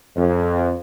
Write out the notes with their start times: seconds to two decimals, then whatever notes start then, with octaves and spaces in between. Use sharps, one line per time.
0.15 F2